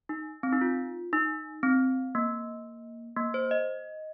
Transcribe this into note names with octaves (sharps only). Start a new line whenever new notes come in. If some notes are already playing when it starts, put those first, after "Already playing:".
D#4
C4
D#4
F4
D#4
C4
A#3
A#3
C5
D#5